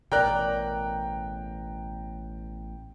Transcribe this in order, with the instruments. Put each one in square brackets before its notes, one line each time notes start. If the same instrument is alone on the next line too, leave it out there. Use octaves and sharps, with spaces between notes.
[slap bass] A1 B2 [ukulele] A#4 D5 [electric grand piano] G5 A#5 F#6